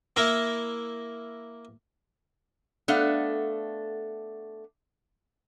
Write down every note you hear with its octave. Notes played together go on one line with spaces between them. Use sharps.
A#3 E4 A#4
A3 B3 D4 A4 F5 F#5